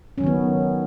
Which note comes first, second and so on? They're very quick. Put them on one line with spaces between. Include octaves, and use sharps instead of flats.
C#4 F#3 D#3 B3